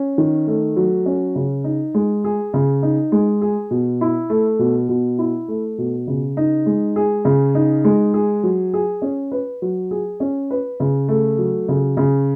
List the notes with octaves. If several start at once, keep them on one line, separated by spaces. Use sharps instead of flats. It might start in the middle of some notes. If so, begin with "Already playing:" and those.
Already playing: C#4
D#3
A3
F#3
C#4
C#3
D#4
G#3
G#4
C#3
D#4
G#3
G#4
B2
E4
A3
B2
B2
E4
A3
B2
C#3
D#4
G#3
G#4
C#3
D#4
G#3
G#4
F#3
G#4
C#4
B4
F#3
G#4
C#4
B4
C#3
A3
F#3
C#3
C#3